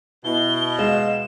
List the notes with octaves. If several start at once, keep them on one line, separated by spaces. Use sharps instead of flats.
B2 E4 G7
G#3 F#4 D#5 F5 E7